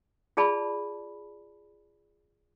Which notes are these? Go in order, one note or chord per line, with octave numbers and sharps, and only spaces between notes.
F4 G#4 D5 A5 B5